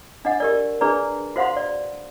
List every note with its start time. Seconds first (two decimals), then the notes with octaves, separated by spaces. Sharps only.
0.25 D4 D#5 F#5
0.40 G4 A#4 D5
0.81 D4 G#4 B4 D5 A#5
1.36 F#4 C5 F5 F#5 C6
1.56 D5